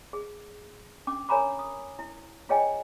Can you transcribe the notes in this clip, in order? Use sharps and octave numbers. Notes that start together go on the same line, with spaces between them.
G#4
C#4 D4 D6
A#4 C#5 G#5 A#5 B5 D6
D#6
E4
F4 G#4 C#5 D#5 G5 G#5